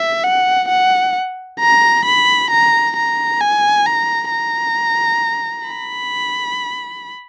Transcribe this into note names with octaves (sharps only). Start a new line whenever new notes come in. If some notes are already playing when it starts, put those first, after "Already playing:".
Already playing: E5
F#5
F#5
A#5
B5
A#5
A#5
G#5
A#5
A#5
B5